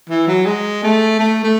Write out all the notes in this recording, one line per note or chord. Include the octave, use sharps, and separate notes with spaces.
E3
F#3
G#3
A3
A3
A3